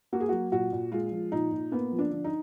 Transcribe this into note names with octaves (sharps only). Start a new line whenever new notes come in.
A#3 F#4
G#4
F#3 F#4
A#2 F#4
A#2
G#3 F4
F3
A#2 D#4
A#2
A#3 B3
F3
D4
D3
D#4